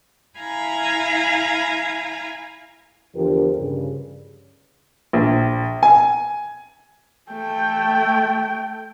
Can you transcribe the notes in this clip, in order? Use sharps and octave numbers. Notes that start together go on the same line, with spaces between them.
E4 F5 G#5 A#5 B5
E2 D3 F3 G4 A#4
G2 C#3
A#1
G#5
A3 G5